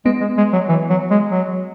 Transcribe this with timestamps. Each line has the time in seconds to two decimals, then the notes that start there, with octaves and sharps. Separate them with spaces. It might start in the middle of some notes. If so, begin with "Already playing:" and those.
0.05 G#3 B3
0.21 G#3
0.38 G#3
0.53 F#3
0.69 E3
0.90 F#3
1.11 G#3
1.31 F#3